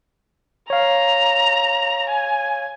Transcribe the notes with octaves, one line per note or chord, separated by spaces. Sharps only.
C#5 F5 A#5
G#5